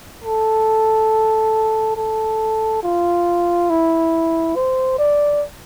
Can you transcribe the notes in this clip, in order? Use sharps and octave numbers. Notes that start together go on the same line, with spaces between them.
A4
A4
F4
E4
C5
D5